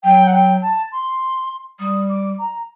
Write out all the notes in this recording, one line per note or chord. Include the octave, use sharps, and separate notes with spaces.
F#3 G5
F#5
G5
A5
C6
G3 D#6
D6
A#5